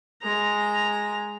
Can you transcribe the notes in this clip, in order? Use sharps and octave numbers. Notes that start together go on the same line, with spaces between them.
G#3 A#5